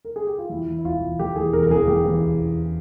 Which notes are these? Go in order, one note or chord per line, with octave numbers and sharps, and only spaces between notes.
A#4
G#4
G4
F4
E2 E4
E3
E4
E1 F4
E1
E2 G4
E3 G#4
E1 A#4
A#4
E1 G#4
E2 G4
E3
E1
E1